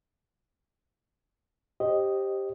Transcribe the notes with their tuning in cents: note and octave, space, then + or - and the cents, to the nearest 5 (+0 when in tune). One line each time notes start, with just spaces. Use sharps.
G4 +0 C5 +25 D#5 +0